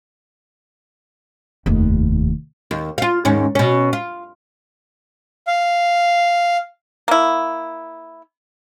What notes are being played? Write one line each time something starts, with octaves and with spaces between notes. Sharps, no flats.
F1 D#2
D#2
F4 F5
D#2 G#2 C#4
B2 C#4
F4
F5
A#3 E4